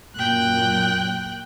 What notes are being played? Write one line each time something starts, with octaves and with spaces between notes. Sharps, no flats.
F#2 A#2 G5 F#6